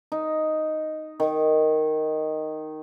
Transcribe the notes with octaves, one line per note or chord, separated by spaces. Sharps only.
D#4
D#3